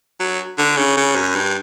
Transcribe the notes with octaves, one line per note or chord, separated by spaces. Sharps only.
F#3
D3
C#3
C#3
F#2
G2